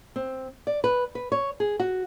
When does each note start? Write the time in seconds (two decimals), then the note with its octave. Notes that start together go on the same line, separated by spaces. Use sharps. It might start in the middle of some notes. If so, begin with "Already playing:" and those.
0.16 C4
0.67 D5
0.84 B4
1.15 B4
1.32 C#5
1.60 G#4
1.80 F#4